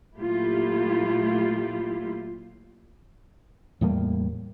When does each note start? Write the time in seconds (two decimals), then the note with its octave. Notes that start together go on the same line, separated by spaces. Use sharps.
0.15 A#2 F#3 A3 E4 F4 G4
3.81 E2 A2 G3 A#3